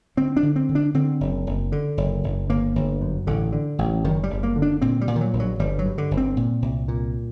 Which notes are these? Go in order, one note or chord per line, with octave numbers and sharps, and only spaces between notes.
D3 C4
D4
D3
C4
D3
D4
D3 C4
F#1
F#1
D3
F#1
F#1
G1 A#3
G1
F#2
A1 D3
D3
A1
F#1 D#3
G3
F#1
A#3
D3
D4
A#2 C4
G3
A#2
D#3
F#3
A#1
F#3
G1 G3
F#3
G2
D3
G1
C4
A#2
C2
A#2